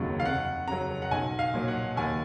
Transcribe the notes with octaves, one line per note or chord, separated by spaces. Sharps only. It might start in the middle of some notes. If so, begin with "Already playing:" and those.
Already playing: F1 D#2 C#3 F#3
F5
F2 F#5
C#3 F#3 A#5
F#5
B1 G#5
F5
A#2 F#3
F#5
D#2 G#5